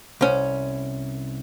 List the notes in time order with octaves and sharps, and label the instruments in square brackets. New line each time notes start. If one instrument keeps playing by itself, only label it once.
[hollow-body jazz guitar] C2 C#4